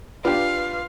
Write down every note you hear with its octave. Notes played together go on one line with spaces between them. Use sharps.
D4 F4 G4 B4 F5